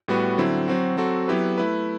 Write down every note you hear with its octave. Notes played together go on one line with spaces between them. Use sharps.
A2 G3 B3 F#4 B4
D3 F#3 C4 E4
F#3 C4 F#4
F#3 C4 F#4 A4
F#3 B3 E4 G4 B4
A3 E4 B4